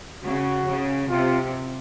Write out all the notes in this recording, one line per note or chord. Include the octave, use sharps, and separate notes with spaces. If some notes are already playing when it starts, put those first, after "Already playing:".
C#3 F#4
C#3
C3 F4